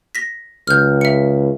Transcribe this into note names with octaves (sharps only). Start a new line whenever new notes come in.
A#6 B6
C#2 F6 G6
E5 C#7